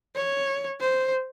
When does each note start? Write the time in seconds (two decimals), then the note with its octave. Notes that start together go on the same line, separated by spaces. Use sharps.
0.16 C#5
0.80 C5